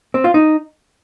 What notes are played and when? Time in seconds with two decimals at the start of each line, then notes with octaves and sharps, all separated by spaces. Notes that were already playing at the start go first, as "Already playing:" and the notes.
0.14 C4
0.24 F4
0.34 D#4